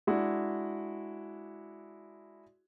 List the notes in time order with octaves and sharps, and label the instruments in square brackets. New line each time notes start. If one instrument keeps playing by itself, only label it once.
[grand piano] G#3 D4 E4 F#4